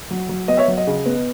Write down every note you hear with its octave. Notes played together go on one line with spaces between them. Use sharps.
F#3
F#3
B3 D#5
C#5 E5
F#3
D#5
C#3
B3